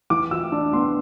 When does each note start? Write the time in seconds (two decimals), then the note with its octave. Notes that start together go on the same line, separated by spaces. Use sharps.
0.10 E3 D6
0.31 F4 E6
0.52 D4
0.73 B3 C6